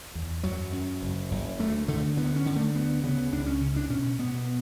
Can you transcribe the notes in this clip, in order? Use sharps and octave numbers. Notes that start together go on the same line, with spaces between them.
E2
F#2 F#3
F#2
F#1
F#1
D2 A3
D3 A3
D3 B3
C#4
D3
A3
D2 B3
C#3 B3
C#2 D4
C#4
C#3
D4
B2 C#4
B2 B3